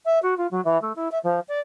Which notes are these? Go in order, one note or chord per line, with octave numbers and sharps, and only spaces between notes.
E5
F#4
F4
F#3
E3
A3
E4
E5
F3
D5